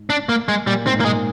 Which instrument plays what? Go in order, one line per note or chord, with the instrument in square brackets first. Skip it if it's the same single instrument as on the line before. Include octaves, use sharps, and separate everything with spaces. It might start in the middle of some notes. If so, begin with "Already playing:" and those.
Already playing: [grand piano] G#2
[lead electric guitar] D4
A#3
G#3
[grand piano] A#2 [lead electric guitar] G3
[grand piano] G#2 [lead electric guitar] C4
[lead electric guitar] A#3
[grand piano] A#2 [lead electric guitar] G#3